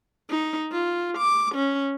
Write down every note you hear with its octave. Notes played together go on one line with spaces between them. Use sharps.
D#4
F4
D6
C#4